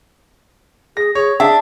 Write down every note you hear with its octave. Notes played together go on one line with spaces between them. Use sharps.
G#4 A#6
G#4 C#5
D4 G#4 E5